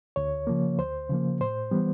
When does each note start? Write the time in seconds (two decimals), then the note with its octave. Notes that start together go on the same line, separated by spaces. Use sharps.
0.16 D2 C#5
0.47 C#3 F3 A#3
0.78 D2 C5
1.09 C#3 F3 A#3
1.40 A2 C5
1.71 E3 G3 B3